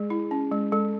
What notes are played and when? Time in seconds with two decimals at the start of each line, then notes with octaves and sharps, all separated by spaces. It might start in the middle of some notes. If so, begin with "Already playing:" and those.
Already playing: G#3 G#4
0.10 E4
0.31 C#4
0.52 G#3
0.72 G#3 A4